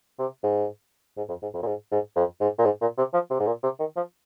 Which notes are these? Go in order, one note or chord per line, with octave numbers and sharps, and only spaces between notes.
C3
G#2
G#2
F2
G#2
F2
A#2
G#2
G#2
F2
G#2
A#2
G#2
A#2
C3
F3
C3
G#2
A#2
C3
D#3
F3